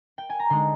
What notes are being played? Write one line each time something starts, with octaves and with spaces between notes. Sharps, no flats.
G5
G#5
A#5
D3 G#3 D#4 C6